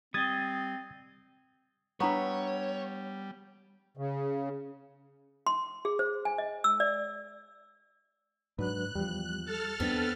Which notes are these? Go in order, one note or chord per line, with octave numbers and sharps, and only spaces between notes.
G3 C4 D#5 D#6 G#6 A6
G3 B3 D4 C#5 E5 A#5 C#6
C#3
C6
G#4
C5
G#5
D#5
E6
D5
G#2 F#3 D4 B4 F#6
E2 F3 G3
A4 A5 F6
E2 B3 C4 D4